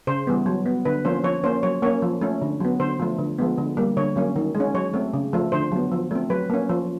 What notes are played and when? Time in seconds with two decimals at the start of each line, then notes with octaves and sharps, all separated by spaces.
0.07 C#3 C5
0.27 E3 G3 B3
0.46 F#3
0.66 B3
0.85 D3 B4
1.05 F3 A#3 C#4 C5
1.24 F3 C#5
1.44 A#3 C#4 C5
1.63 F#3 C#5
1.82 A#3 C#4 C#5
2.02 F3
2.21 A3 C#4
2.42 D3
2.60 F#3 B3
2.80 D3 C5
3.00 F3 A3
3.19 D3
3.38 F3 G#3 B3
3.58 D3
3.77 G3 A#3
3.97 D3 C#5
4.16 F#3 A#3 C#4
4.36 D#3
4.55 G#3
4.60 C#4
4.74 F#3 C#5
4.94 A3 C4
5.13 C#3
5.33 F3 A3
5.52 D3 C5
5.72 F#3 B3
5.92 F3
6.11 A3 C4
6.30 F#3 B4
6.50 A#3 C#4
6.69 F3